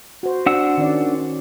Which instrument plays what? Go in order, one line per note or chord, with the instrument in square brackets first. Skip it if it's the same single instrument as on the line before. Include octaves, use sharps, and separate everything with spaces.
[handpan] F#4 C5
[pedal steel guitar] D4 F#5 E6
[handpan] D#3 C#4 D5